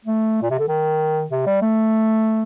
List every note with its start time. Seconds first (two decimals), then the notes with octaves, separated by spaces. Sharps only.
0.05 A3
0.42 A#2
0.51 C3
0.59 D3
0.68 D#3
1.30 C3
1.46 G3
1.62 A3